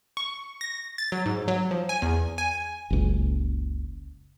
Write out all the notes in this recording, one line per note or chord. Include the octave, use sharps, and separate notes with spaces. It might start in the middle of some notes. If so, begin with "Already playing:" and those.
C#6
A#6
A6
F#3
G#2
F#3
F3
G#5
E2
G#5
F#1 C#2